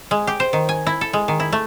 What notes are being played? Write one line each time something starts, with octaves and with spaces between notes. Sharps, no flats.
G#3
G4
C5
D#3
G#5
E4
A4
G#3
D#3
E4
A3